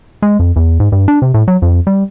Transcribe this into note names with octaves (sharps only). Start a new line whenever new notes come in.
G#3
F2
E2
G#2
G2
D4
C3
A2
F#3
F2
G3